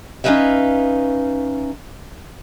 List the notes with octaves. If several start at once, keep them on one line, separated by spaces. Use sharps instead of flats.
C#4 D#4 E4 B4 E5 F5